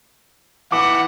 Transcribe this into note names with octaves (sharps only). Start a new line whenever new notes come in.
E3 F#5 D6